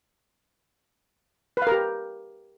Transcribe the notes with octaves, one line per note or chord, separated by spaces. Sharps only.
G4 A#4 B4 F5